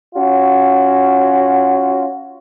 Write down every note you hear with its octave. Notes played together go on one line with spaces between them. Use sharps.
C#4 F4 F#4